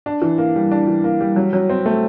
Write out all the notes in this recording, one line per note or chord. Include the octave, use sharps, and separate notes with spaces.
D4
E3
A#3
G3
D4
E3
A#3
G3
F#3
F#3
C4
A3